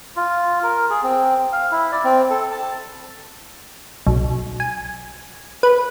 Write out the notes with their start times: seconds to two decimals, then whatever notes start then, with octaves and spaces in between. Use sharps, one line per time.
0.16 F4
0.63 A#4
0.90 G#4
1.03 C4
1.52 F5
1.72 E4
1.92 D5
2.04 C4
2.30 A4
2.51 A5
4.07 B1
4.60 G#5
5.63 B4